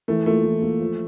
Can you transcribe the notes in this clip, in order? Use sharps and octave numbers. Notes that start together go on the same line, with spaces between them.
E3 A3
A3 A#3 F4
E3
A#3 F4
F3